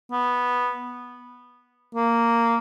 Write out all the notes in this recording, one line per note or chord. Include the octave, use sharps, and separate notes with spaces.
B3
A#3